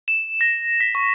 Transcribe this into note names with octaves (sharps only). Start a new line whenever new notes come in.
E7
A#6
B6
C#6